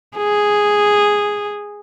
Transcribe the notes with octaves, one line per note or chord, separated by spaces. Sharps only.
G#4